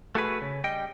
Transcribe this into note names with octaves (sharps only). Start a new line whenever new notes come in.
A3 F#4 G#4 B4
C#3
G3 D#5 G5